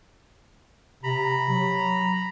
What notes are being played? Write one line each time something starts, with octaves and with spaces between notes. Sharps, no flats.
C3 A#5 B5
F#3